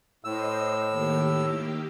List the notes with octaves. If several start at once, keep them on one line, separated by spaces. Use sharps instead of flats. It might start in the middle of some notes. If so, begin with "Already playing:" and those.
A2 C5 D#5 E6
D#3 A#3 G4